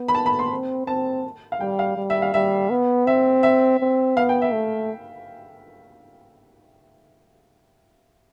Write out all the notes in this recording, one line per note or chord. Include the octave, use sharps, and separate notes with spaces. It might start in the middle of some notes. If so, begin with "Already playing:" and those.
Already playing: B3
B5
A5
B5
C6
C4
C4 A5
F5
G3 G5
F5
G3
E5
F5
G3 E5
B3
C4 E5
E5
C4
B3 F5
G5
E5
A3